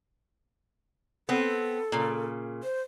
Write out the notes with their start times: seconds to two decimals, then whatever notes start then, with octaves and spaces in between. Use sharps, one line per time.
1.29 B3 C4 A4
1.92 A#2 C#3
2.63 C5